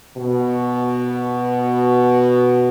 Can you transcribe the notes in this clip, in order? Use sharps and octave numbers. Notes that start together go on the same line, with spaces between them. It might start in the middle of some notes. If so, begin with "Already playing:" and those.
B2